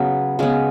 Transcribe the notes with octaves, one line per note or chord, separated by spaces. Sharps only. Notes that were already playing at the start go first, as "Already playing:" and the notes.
Already playing: C#3 F#3 B3
C#3 G#3 B3